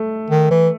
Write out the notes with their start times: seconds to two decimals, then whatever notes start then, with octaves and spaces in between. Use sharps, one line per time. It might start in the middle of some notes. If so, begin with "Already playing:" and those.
Already playing: A3
0.30 D#3
0.51 E3